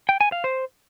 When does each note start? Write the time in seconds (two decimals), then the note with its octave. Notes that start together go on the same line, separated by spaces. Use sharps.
0.09 G5
0.21 G#5
0.32 F5
0.44 C5